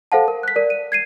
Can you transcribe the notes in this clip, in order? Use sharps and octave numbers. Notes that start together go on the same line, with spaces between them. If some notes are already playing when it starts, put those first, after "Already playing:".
A4 C5 F5 F#5 A5
A#4
F#6 B6
A#4 D5
D#7
G#6 C7 D#7